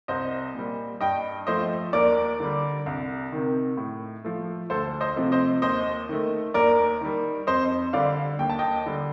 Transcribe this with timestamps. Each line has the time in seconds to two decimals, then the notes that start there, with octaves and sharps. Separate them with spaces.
0.08 C2 C5 D#5
0.55 A#2 G3
1.01 G2 D#5 G5
1.47 F3 A3 C5 D#5
1.93 D#2 A#4 D5
2.40 D3 G3
2.86 C2
3.32 C3 D#3
3.77 A2
4.25 F3 A3
4.70 D2 A4 C5
5.01 C5 D#5
5.16 C3 F3 A3
5.32 C5 D#5
5.62 D#2 C5 D#5
6.09 D#3 A3
6.54 D#2 A#4 D5
7.01 D#3 G3
7.47 F2 C5 D#5
7.93 D3 G3 D5 F5
8.39 D#2 G5
8.50 A5
8.59 D#5 G5
8.86 D3 G3